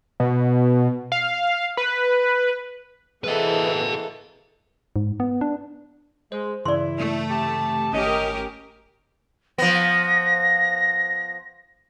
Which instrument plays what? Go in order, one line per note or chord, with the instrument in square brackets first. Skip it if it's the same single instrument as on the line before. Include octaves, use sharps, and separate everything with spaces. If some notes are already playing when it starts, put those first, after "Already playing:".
[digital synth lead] B2
F5
B4
[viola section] E3 C4 G#4 [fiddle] A#3 A4 [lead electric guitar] B4 D#5
[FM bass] G#2
B3
D4
[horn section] G#3 [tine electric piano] C5
[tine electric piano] G2 C#3 E3 [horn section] E4 [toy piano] D5 C6
[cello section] A3
[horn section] C3 G4 A5
[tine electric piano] G#1 A3 [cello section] C#4 G4 A#4 [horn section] D#5
[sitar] F3 B3 [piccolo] A#6